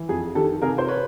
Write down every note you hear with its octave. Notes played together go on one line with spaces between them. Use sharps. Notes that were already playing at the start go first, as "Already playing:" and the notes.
Already playing: E3
F2 G#4
D#3 G4 A4
C3 G#4 A#4
C5
B4 C#5